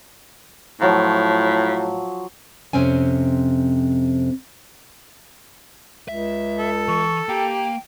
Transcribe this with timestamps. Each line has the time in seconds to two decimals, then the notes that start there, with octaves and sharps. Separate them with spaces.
0.81 A2 F3 F#3
2.73 F2 C3 C4 C#4 G#5
6.08 C#2 E5
6.58 A4
6.88 E3 C#6
7.29 A#3 G4 G5 A#5